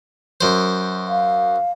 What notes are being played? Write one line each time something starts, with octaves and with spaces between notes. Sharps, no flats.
F#2 C5
F5